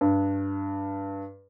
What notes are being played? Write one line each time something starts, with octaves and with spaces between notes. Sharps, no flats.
G2